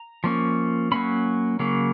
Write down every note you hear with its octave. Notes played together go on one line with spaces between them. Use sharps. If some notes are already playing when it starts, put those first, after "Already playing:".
Already playing: A#5
F3 A#3 C#4
F#3 A#3 C#4 B5
C#3 F#3 A#3